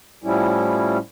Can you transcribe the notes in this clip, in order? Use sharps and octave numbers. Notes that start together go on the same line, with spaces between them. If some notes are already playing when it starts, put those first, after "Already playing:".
A2 F3 G3 C#4 E4